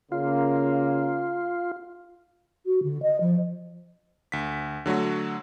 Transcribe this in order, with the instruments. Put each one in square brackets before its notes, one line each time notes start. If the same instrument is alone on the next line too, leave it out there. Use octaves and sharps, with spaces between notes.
[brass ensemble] C#3 A#3 [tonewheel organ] F4
[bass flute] F#4
D3
D#5
F3
[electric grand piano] D2 B6
D3 F#3 A3 F#4